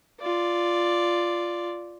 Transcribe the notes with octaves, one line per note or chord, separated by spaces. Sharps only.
F4 D5